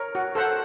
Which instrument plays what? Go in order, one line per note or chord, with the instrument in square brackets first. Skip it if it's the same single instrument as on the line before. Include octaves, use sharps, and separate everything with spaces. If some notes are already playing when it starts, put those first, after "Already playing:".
Already playing: [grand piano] A#4 C#5
[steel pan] F#4
A4 C5 F#5